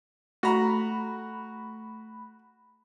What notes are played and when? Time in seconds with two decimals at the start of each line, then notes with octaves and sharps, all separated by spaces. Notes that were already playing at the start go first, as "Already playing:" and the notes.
0.43 A3 F#4 A#5 B5